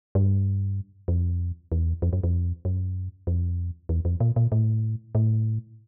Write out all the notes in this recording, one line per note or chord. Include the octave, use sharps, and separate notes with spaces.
G2
F2
E2
F2
F#2
F2
F#2
F2
E2
F2
A#2
A#2
A2
A2